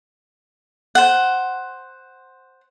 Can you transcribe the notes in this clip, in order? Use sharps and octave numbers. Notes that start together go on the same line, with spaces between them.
C5 F#5